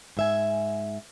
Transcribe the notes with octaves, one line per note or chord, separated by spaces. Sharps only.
G#2 E5 G#5